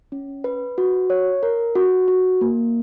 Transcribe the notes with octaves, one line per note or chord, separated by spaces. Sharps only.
C#4
B4
F#4
C#5
A#4
F#4
F#4
A#3